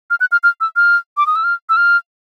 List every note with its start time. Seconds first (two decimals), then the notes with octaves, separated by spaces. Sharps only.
0.10 F6
0.20 F#6
0.32 F6
0.43 F6
0.61 E6
0.76 F6
1.17 D6
1.27 D#6
1.36 E6
1.44 F6
1.69 E6
1.77 F6